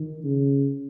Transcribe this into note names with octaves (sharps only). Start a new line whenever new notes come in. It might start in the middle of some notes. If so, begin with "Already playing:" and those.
Already playing: D#3
C#3